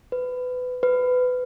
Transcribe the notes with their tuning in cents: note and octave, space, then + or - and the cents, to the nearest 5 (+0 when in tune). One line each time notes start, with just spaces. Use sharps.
B4 +25
B4 +25